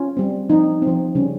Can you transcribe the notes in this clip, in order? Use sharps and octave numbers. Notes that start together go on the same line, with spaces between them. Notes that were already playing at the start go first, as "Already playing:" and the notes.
Already playing: C#4 F4
G3 C4
F3 C4 D#4
C4
F3
C#3 G3 C#4